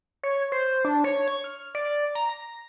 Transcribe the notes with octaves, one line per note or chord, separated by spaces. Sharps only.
C#5
C5
D4
C#5
C#6
F6
D5
A#5
A#6